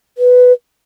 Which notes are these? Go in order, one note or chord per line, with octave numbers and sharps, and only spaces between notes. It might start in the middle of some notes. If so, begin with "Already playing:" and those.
B4